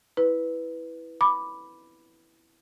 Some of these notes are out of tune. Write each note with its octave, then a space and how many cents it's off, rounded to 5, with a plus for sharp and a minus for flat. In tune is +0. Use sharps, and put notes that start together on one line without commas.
E4 -5 B4 +0
B5 +0 D6 +0